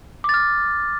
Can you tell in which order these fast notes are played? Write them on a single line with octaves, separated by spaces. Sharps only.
D6 A6 F6